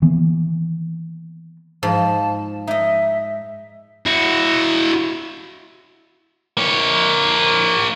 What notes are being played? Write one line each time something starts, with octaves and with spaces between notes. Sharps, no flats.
D#3 E3 A#3 B3
G#2 F3 A5
D#4 D#5 E5
E4 F#4
A#3 C#5